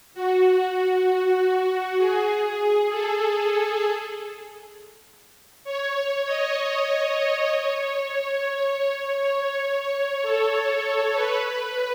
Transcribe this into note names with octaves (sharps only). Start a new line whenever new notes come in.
F#4
G#4
A4
C#5
C#5
D#5
D#5
C#5
C#5
A4
A4
B4
B4